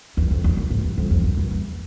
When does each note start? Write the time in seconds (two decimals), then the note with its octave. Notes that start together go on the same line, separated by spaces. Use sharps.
0.17 E2
0.31 F2
0.44 E2
0.57 F#2
0.70 G#2
0.84 G2
0.98 F2
1.11 F2
1.24 F#2
1.37 G2
1.51 E2